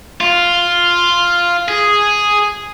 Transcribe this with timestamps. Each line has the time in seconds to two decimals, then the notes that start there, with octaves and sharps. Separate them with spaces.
0.21 F4
1.68 G#4